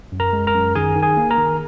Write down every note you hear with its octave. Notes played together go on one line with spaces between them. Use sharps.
F#2
A#4 A#5
G#3
A#4 A#5
F#2
D#3 G#4 G#5
D#3
G#4 G#5
A#3
A#4 A#5
D#3